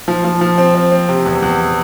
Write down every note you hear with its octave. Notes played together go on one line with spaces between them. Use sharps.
F3
F3
F3
C4
C4
C4
C3
E2
E2